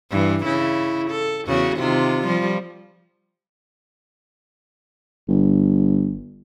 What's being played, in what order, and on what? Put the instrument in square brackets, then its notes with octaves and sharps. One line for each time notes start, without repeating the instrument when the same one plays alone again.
[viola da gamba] G2 E3
C#3 E4
A4
E2 C#3 F#4
C3 D#3 F4
F3 G3
[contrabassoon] G1